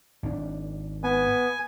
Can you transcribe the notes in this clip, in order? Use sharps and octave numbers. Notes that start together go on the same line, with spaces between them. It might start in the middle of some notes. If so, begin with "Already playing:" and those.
G#1 D4
B3 G#5